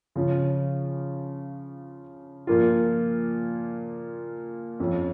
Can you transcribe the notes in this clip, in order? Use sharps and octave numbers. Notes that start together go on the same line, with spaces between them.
C#3 F3 C#4 F4
A#2 F3 A#3 F4
F2 F3 C#4 F4